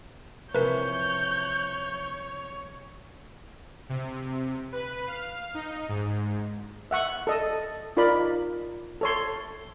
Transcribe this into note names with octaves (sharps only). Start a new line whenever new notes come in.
C3 E3 F3 A#4 B4 C#5 G6
C3
B4
F5
D#4
G#2
E5 F#5 C#6
A4 D#5
D#4 F4 A#4 D5 B5
A4 C#5 C6